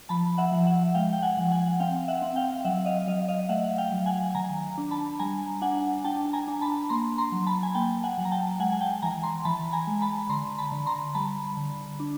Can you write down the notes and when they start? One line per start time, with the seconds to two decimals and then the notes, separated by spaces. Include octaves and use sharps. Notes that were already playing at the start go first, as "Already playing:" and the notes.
0.09 F3 A5 B5
0.38 E5 F#5
0.52 F3
0.67 E5 F#5
0.95 G#3 F5 G5
1.13 G5
1.22 F#5 G#5
1.37 F3
1.52 F#5 G#5
1.80 C4 F5 G5
2.08 E5 F#5
2.22 C4
2.36 F5 G5
2.65 F#3 E5 F#5
2.86 D#5 F5
3.07 F#3 D#5 F5
3.28 D#5 F5
3.49 A3 E5 F#5
3.78 F5 G5
3.92 F#3
4.06 F#5 G#5
4.35 D#3 G#5 A#5
4.78 D4
4.91 A5 B5
5.19 G3 G#5 A#5
5.62 D4 F#5 G#5
6.04 D4 G5 A5
6.33 G#5 A#5
6.48 D4
6.61 A5 B5
6.89 A#3 A#5 C6
7.18 A#5 C6
7.32 F#3
7.46 A5 B5
7.63 G#5
7.74 A#3 G5 A5
8.03 F#5 G#5
8.18 F#3
8.25 A#5
8.32 G5 A5
8.59 G#3 F#5 G#5
8.72 G#5
8.80 G5 A5
9.02 E3 G#5 A#5
9.23 A#5 C6
9.45 E3 A5 B5
9.73 G#5 A#5
9.87 G#3
10.02 A5 B5
10.29 D3 A#5 C6
10.58 A5 B5
10.72 D3
10.86 A#5 C6
11.15 G3 A5 B5
11.57 D3
12.00 D4